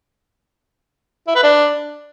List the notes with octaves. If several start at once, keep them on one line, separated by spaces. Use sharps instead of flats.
E4
B4
D4